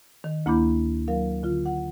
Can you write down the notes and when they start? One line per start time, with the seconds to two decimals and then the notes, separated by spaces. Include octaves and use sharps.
0.24 D#3
0.46 D2 A#3 E4 B5 D6 G6
1.08 F#3 A#4 F5
1.43 D3 F4
1.66 F#5